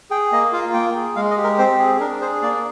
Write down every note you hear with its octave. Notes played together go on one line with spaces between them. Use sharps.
G#4 G5
A#3 D#5
F4 F5
A#3 G5
G#4
G#3 F5
D#5
G4
A#4
C4 C5
G#4
G#4
D4 A#4
G#4 C5
A#3 D5